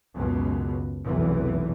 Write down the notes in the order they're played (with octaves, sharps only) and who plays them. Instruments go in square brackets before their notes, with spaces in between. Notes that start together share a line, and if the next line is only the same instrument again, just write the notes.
[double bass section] C#2 F#2 B2
F1 B1 E2 E3